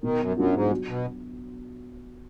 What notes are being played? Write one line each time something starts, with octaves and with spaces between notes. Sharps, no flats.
B2 D#3
F#2
F#2 F#3 D4 F4
G#2
F#3
B2